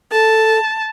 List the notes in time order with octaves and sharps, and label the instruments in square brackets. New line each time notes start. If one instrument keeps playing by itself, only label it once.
[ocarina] A4 [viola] A5